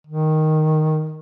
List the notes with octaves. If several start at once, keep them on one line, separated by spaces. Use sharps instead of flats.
D#3